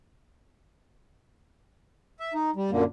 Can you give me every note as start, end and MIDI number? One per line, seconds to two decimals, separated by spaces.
2.20 2.33 76
2.34 2.50 63
2.56 2.71 55
2.71 2.84 42
2.71 2.84 46
2.71 2.84 50
2.71 2.84 58